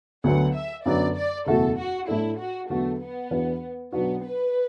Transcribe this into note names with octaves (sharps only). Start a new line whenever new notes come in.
D2 D3 F#3 B3 F#5
E5
F#2 D3 F#3 B3 D5
D5
F#1 E2 B2 A3 F#4 A4
F#4
A2 A3 D4 E4 A4
F#4
E2 D3 F#3 A3 B3 F#4
B3
E2 E3 D4 F#4 B4
B1 B2 F#3 B3 D4 F#4
B4